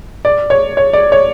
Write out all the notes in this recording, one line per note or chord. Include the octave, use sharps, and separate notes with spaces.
D5
C#5
C#5
D5
C#5